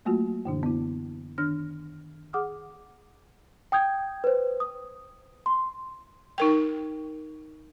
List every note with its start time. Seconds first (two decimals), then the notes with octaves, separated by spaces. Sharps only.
0.05 F#3 A3 A#3 F4 F#4
0.45 F#2 A#2 D3 E3 D4
0.63 B3 E4
1.38 D#3 D4 F6 A#6
2.33 G#4 F#5 D6 D#6 F6
3.72 G5 D#6 G6 G#6
4.24 B4 C5
4.60 D#6
5.46 C6
6.38 D#4 A#4 G5